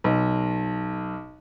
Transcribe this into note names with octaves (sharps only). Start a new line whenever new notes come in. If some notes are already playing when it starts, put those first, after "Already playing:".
B1